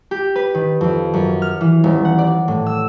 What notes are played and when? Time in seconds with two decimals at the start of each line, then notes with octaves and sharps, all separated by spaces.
0.11 G4
0.36 B4
0.55 D#3
0.81 F2
1.14 F#2
1.42 F6
1.61 E3
1.84 D#1
2.05 F#5
2.18 D5
2.48 A2
2.66 E6